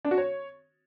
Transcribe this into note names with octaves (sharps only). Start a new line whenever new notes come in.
D4
F#4
C#5